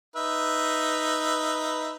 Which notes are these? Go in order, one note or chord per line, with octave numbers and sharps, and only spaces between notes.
D#4 B4 E5